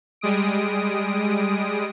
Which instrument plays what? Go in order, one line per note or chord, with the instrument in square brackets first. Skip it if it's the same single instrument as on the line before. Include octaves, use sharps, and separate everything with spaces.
[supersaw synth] G3 G#3 D#6 D7